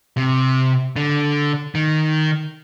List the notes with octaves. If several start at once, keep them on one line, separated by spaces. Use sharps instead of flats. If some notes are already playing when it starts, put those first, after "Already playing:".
C3
D3
D#3